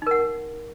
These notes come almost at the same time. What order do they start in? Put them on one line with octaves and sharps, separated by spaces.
D#4 A#4 F#5